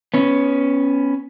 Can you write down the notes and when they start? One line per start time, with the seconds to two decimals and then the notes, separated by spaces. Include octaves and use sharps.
0.14 B3 C#4